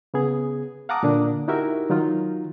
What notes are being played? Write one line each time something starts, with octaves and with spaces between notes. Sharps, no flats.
C#3 B3 G#4
F5 F#5 A5 A#5 D6 D#6
A#2 D3 A#3 D4
D#4 E4 F#4 G4 A#4 E5
D#3 F#3 D#4 F4